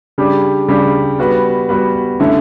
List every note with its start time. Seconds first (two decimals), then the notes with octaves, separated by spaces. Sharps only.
0.18 C#3 G3 D4 G4
0.68 C#3 G3 D4 G4
1.19 G3 B3 F#4 B4
1.69 G3 B3 F#4 B4
2.20 D3 A3 C#4 E4